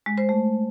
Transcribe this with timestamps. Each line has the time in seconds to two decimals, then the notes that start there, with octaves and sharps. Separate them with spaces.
0.06 G#3
0.18 C5
0.29 A3